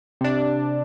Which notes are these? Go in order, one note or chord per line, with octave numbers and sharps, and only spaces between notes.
C3 D4